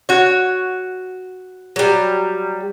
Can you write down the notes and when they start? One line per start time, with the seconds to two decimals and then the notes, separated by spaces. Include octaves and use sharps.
0.09 F#4 C#5
1.76 F#3 G3